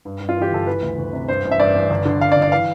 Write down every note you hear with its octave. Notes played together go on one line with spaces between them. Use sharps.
G2
G2
F4
E3
G4
G1 A4
E3 B4
D2
D2
C3
G2 C5
A1
E5
G2 D5
A1
G1
D3
G1 F5
D5
G1
D5
E3 F5